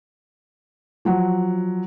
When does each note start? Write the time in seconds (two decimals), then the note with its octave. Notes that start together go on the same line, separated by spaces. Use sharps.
1.05 F3 F#3 F#5